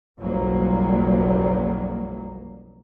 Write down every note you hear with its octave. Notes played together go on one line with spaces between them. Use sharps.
F#1 B1 F2 F#3 G3 A#3